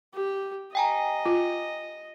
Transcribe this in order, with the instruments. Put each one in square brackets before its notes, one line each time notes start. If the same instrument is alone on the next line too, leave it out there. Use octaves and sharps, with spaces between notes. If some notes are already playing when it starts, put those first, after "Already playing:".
[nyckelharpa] G4
[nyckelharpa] D#5 [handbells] G5 G#5 A#5
[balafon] F4